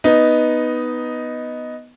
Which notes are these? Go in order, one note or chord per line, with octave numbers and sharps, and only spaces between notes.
B3 D#4